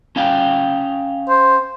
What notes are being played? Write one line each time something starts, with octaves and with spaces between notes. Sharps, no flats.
C#4 F5 G5
C5